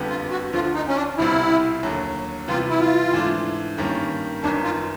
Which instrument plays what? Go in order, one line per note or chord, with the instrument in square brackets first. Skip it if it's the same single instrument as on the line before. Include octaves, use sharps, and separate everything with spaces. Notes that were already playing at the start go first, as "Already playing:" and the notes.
Already playing: [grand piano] F#1 F2 D3 G3 B3
[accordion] F4
F#4
[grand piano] D2 D3 F3 [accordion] F4
[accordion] D#4
C#4
D4
[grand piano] C2 B2 G3 C4 F4 [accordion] E4
[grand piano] D#2 D3 F#3
[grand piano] C3 E3 G3 B3 [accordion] F4
[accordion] E4
F4
[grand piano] G#2 E3 A3 D4
G2 D#3 G3 A#3 C#4
[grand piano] G1 F#2 D#3 [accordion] D4
[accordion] F4